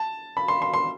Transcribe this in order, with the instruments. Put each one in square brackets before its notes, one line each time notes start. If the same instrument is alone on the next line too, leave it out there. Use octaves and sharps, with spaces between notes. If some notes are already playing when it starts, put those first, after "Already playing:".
Already playing: [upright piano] A5
B5
C6
C6
C6